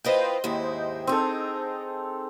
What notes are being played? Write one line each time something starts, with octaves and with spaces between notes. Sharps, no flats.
E4 F4 B4 C5 D#5 G5
D#2 G#2 E4
C4 D#4 G#4 A4